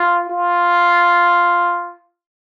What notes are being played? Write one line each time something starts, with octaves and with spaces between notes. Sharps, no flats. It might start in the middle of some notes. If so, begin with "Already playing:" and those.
Already playing: F4
F4